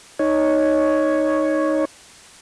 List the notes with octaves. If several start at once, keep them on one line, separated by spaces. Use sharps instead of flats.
D#4 C#5